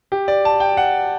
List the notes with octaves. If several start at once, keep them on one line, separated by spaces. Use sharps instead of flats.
G4
D5
A5
G5
F#5